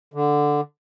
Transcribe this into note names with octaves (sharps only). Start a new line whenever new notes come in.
D3